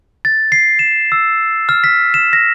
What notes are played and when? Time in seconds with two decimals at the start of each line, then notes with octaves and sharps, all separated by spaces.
0.25 A6
0.52 C7
0.79 E7
1.12 E6
1.69 F6
1.84 B6
2.14 E7
2.33 A#6